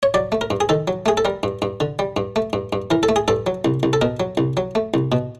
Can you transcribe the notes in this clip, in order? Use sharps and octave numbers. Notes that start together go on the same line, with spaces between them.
C#5
F#3 D5
A3
A#4
G2
G#4
D#3 A4
F#3
A3 G#4
A4
G3 A#4
G2
G2
D3
G3
G2
A3
G2
G2
E3 A#4
A4
A3
G#4
G2 A4
F#3
C2
C2
A4
B2 A#4
F#3
C2
F#3
A3
C2
B2